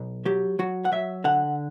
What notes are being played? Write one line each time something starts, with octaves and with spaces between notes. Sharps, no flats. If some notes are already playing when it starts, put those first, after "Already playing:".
Already playing: B1
F#3 G4
F#3 F#4
F#5
F#3 E5
D3 F#5